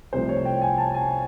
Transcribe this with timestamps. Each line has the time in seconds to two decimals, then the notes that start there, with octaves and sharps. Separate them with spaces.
0.13 C2 C3 F3 A3 C5
0.29 C#5
0.45 G5
0.61 G#5
0.78 A5
0.94 G#5